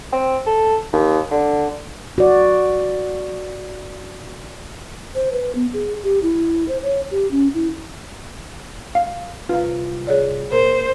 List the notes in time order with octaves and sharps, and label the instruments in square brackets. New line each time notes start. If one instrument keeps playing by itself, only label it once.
[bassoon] C4
A4
D#2
D3
[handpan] F#4 D5
[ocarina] C5
B4
B3
G#4
G4
E4
C5
C#5
G4
C#4
E4
[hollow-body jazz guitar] F5
[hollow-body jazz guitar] C2 F4 [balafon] B4 F5
[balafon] G#4 C#5 D5
[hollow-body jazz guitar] A#2 [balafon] A#4 [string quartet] C5